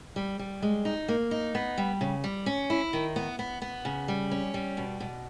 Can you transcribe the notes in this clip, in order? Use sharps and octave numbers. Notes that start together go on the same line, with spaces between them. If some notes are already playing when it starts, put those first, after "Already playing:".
G3
G3
G#3
D#4
A#3
D#4
B3
G3
C#3
G3
C#4
E4
D#3
B3
B3
B3
C#3
G3
C#4
G3
B2
B2